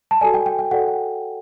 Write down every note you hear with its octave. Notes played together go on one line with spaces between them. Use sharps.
A5
F#4 A4 D5 G#5
G5
G5
G5
F#4 A4 D5 F#5
G5